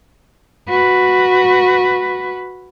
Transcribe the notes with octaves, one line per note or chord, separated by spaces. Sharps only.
F#4 B4